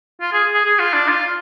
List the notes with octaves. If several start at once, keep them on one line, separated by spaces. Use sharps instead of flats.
F4
G#4
G#4
G#4
F4
D4
F4